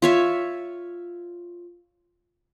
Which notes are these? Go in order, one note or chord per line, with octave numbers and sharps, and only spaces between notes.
F4 C#5 E5